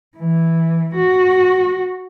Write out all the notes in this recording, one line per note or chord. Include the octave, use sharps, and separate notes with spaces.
E3
F#4